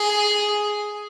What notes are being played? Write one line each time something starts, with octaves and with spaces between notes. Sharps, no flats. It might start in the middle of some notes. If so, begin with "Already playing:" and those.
Already playing: G#4